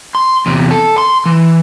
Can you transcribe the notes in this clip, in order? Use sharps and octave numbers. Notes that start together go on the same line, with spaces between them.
C6
E2 C3
A4
C6
E3